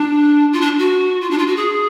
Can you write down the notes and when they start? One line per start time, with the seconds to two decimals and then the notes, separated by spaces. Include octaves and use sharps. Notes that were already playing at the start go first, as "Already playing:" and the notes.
Already playing: D4
0.53 F4
0.61 D4
0.79 F#4
1.21 F4
1.30 D4
1.38 F4
1.47 F#4
1.56 G#4